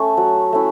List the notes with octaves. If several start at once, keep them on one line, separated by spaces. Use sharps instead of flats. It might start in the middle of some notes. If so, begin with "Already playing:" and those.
Already playing: A3 C#4
F#3
A3 C#4 E4